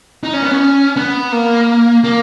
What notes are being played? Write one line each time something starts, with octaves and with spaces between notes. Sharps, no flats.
D#4
C#4
B3
C#4
B3
A#3
A#3